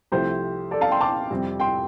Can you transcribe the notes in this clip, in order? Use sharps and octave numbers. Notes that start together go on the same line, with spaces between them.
C2 C3 F3 A3 G4 C5
A4 D5
F5 A5
G5 C6
A5 D6
F2 C3 G3 C4
G5 C6